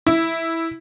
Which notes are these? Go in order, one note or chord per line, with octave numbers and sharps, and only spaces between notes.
E4